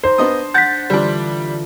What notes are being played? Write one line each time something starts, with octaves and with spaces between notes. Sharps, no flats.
D#4 C5
B3 D4 D#5 D#6
F#5 G6 A6 B6
D3 E3 G3 D4 F4